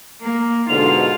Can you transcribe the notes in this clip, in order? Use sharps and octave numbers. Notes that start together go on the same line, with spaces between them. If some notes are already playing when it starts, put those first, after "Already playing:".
A#3
G#2 B2 D3 F4 F7